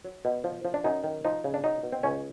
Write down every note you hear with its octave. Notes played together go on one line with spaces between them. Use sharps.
F#3
B2
F3
F3
D4
F#2 D#4
D#3
F3 D#4
C#3
D4
F#3 D#4
B2
C4
C#2 C#4